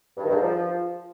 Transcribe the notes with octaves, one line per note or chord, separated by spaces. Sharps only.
G2
D#3
G2
G#2
F3